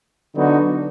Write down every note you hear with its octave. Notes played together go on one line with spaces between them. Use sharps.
D3 F#3 B3 D#4 F#4